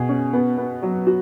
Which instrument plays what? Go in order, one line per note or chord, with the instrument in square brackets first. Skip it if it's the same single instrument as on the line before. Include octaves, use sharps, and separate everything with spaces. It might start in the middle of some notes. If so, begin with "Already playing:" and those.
Already playing: [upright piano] B2 G#4
C#4
B3
B3
F#3
F#4